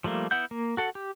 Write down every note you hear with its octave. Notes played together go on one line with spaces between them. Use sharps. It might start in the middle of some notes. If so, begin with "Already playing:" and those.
F3 G3 A3 A#3
B3 E4 F#5 G6
A#3
F#4 A4 F#5
G4